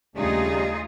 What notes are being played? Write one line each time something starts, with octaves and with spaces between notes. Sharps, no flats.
D#2 C#3 G3 A3 D4 D#4 F4 G#4